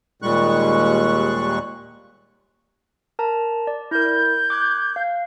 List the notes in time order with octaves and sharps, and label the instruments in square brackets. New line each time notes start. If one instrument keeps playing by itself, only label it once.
[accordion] D#2 A#2 G3 G#3 C#6 F#6
[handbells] A#4 A5 A#5
D5
[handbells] E4 A#4 [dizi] G6
[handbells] D6 F#6 G#6
F5